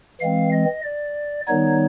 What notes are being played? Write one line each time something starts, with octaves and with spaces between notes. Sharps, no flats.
E3 G#3 C4 F5
D#5
D5
D#3 G3 B3 D#4 C#5